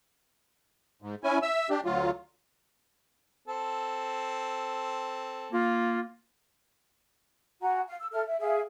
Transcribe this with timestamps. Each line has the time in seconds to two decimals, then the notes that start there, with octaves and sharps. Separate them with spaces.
1.02 G#2
1.24 C#4 E4 G#5
1.42 E5 E6
1.70 D4 G4
1.85 D2 F#3 F4
3.48 C4 A4
5.52 A#3 F4
7.61 F#4 F#5 G#5 A#5
7.87 F5
8.00 E6
8.12 A4 E5 F6
8.26 E5
8.39 G#4 E5 F5